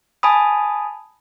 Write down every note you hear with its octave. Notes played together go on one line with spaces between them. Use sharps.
G#5 A5 B5 D#6